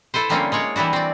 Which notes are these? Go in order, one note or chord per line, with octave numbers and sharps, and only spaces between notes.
E4 A4 B4 C5
D3 G3 A3 A#3 C4 C#4
G#3 A#3 C#5 D5
E3 G3 D4 E4 F#4
C4 D5